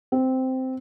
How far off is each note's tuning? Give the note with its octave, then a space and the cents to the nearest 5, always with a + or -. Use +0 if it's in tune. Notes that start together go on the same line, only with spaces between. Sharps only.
C4 -10